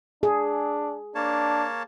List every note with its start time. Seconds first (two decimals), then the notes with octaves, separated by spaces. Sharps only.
0.23 D4 G#4
1.15 A#3 D4 C#5 A5